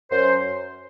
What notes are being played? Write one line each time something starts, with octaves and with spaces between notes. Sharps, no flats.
F#2 C5